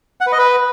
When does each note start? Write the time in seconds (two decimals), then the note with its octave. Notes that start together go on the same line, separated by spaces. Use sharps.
0.21 F#5
0.26 B4
0.32 D#5
0.38 B4